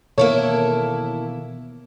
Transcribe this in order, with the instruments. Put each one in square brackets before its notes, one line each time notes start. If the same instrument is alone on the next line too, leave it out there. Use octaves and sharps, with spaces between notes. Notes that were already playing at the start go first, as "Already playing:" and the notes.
[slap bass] B2 D#3 E3 [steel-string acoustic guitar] A#3 E4 A4 [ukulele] C#5